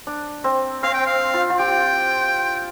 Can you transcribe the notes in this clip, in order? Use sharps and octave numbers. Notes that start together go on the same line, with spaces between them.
D4
C4
C4 F5
G5
F5
F4
F4
G4 G5